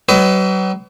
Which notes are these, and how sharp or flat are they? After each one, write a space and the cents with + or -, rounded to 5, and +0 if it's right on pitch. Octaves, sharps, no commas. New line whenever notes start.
F#3 +45 B4 +35 D#5 +35